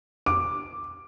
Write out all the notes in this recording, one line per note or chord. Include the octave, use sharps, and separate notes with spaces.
D6